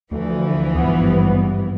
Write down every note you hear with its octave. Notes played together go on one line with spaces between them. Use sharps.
D2 E3 F3
G#1 G2 G3 B3